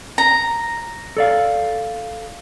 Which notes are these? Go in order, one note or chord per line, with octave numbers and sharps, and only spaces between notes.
A#5
A4 D5 F5